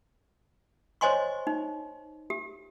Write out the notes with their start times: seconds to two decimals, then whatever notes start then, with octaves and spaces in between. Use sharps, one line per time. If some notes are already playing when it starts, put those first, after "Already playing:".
1.01 C5 C#5 D#5 G#5 C6 C#6
1.47 D#4
2.30 G4